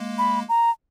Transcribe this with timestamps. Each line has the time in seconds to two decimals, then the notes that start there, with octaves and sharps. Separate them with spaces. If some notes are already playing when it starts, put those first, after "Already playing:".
Already playing: G#3 A#3
0.18 B5
0.49 A#5